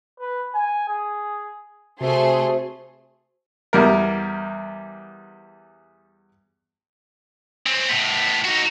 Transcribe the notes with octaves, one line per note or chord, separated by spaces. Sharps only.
B4
G#5
G#4
C3 A3 F#4 G#4 C5 E5 C6
E2 G3 A#4
C4 C#4
A2 B3
D#4 F#4